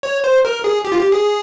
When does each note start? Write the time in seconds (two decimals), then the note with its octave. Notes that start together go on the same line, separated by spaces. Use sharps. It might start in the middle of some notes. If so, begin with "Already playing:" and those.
0.03 C#5
0.24 C5
0.45 A#4
0.64 G#4
0.85 G4
0.92 F4
0.98 G4
1.12 G#4